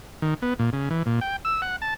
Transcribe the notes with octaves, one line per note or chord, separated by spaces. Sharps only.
D#3
B3
A#2
C#3
E3
A#2
G5
E6
F#5
A5